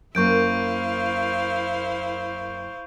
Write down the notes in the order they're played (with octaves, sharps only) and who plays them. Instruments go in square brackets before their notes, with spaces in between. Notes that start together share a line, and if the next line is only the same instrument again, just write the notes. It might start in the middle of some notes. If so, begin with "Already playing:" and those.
[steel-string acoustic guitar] F#2 A#3 [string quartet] E4 C5 F5 [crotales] C#6 G6 D7